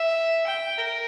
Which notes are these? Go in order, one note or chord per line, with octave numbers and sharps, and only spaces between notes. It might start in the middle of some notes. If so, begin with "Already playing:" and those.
Already playing: E5
G5
A#4